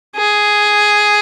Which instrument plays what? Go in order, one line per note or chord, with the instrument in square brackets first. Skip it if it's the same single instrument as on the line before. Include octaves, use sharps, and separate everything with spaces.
[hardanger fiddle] G#4